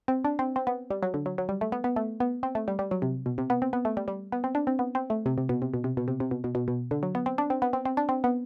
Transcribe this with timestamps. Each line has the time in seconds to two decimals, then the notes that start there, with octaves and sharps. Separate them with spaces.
0.08 C4
0.24 D4
0.39 C4
0.56 C4
0.67 B3
0.91 G3
1.03 F#3
1.14 D3
1.26 F#3
1.38 F#3
1.49 G3
1.61 A3
1.72 B3
1.84 B3
1.96 A3
2.20 B3
2.43 C4
2.55 A3
2.68 G3
2.79 G3
2.91 F#3
3.02 C3
3.26 B2
3.38 C3
3.50 B3
3.62 C4
3.73 B3
3.85 A3
3.97 G3
4.08 G3
4.32 B3
4.44 C4
4.55 D4
4.67 C4
4.79 B3
4.95 C4
5.10 A3
5.26 C3
5.38 C3
5.49 B2
5.62 C3
5.74 B2
5.84 C3
5.97 B2
6.08 C3
6.20 C3
6.31 B2
6.44 B2
6.55 B2
6.68 B2
6.91 D3
7.03 F#3
7.15 B3
7.26 C4
7.38 D4
7.50 C4
7.62 B3
7.73 C4
7.85 C4
7.97 D4
8.09 C4
8.24 B3